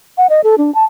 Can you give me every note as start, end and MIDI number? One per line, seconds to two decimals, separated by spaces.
0.18 0.27 78
0.29 0.41 75
0.44 0.55 69
0.58 0.73 62
0.75 0.83 81